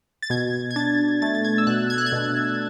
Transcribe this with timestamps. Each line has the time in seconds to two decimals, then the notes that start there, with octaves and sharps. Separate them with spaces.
0.22 A6
0.30 B2 G#6
0.71 G#6
0.76 D4 A6
1.22 A3 A6
1.35 A6
1.45 G#6
1.58 E6
1.67 B2 F#6
1.90 G#6
1.98 F#6
2.06 G#6
2.12 B2